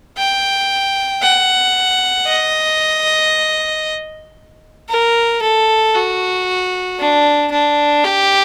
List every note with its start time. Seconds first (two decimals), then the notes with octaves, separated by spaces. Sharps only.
0.17 G5
1.22 F#5
2.27 D#5
4.89 A#4
5.42 A4
5.95 F#4
6.99 D4
7.51 D4
8.04 G4